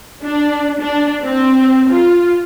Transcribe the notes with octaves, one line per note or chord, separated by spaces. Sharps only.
D4
D4
C4
F4